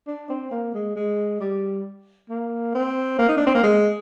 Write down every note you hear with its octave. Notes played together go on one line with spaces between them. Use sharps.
D4
C4
A#3
G#3
G#3
G3
A#3
C4
A#3
D#4
D4
C4
A#3
G#3